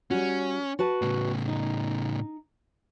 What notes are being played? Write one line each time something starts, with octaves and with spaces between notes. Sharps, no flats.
G3 C#4 F#4
F#4 B4 A5
A2 C#3
D#4